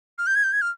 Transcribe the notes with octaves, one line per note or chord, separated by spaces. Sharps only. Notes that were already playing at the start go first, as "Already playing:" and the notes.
F6
G6
G#6
G6
G#6
F6